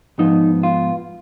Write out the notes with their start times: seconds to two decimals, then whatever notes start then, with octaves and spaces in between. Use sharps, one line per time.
0.18 G#2 F3 B3 D#4
0.63 F4